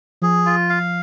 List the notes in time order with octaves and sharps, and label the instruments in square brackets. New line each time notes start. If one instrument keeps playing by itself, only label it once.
[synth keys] F3 [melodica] G#4
[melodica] F4
F5